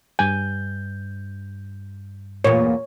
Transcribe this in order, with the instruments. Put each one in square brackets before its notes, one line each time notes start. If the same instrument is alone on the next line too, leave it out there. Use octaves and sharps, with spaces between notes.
[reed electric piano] G2 G6 [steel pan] G#5
[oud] E2 A#2 [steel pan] C#5